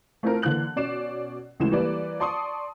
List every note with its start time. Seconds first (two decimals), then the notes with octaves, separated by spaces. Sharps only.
0.23 A3 C4 E4 F4 A4 A#4
0.42 D3 E3 A#3 F#6 F#7
0.76 B2 C#4 D5 C7 E7
1.60 D2 C#3 E3 G#3 E4 E7
1.71 E3 G3 A#3 B4 D5
2.20 D5 A5 C6 C#6 D#6